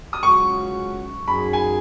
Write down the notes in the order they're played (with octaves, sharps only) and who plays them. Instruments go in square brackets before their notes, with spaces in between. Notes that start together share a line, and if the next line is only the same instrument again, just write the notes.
[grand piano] D#6
[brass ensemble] C#2 C#3 F#3 C#4 F#4 [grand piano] C#6
[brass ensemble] F#2 F#3 D#4 G#4 [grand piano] B5
[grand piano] G#5